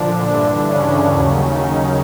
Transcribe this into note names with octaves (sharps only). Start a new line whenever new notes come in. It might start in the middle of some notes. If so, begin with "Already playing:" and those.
Already playing: A#2 D3 F3 D4
G2 D3 E3 D4
C#3 C#4
D#2 D#3 F#3
D#3 D#4